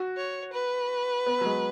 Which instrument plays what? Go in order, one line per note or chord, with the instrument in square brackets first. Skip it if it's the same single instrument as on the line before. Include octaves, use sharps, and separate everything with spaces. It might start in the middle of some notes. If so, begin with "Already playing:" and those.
Already playing: [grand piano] F#4
[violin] C#5
B4
[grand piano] B3
F#3
G#3